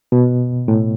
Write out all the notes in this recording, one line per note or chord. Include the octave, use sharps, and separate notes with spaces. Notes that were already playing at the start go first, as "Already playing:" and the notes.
B2
A2